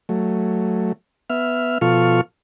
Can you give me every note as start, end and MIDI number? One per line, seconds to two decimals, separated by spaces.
0.09 0.92 54
0.09 0.92 57
1.30 1.78 59
1.30 1.78 76
1.30 1.78 89
1.81 2.21 47
1.81 2.21 53
1.81 2.21 65
1.81 2.21 69
1.81 2.21 85
1.81 2.21 89